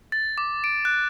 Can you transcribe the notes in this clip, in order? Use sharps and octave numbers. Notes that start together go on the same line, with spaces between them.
A6
D6
D7
F#6